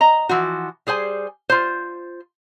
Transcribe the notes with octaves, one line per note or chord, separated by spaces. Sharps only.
D#5 A#5
E3 F3 F#4
G3 G#4 C5 G#5
F4 C5